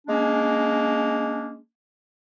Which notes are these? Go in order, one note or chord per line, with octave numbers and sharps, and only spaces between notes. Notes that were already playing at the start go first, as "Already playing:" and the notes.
G#3 A#3 C#4 D4